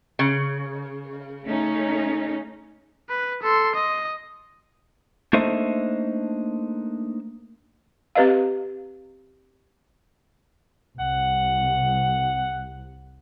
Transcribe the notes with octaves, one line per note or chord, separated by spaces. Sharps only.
C#3
A3 C#4 D#4
B4
A4 C6
D#5
A3 A#3 D4 D#4 C5 E5
C4 G4 B4 D#5 F5
C2 F#5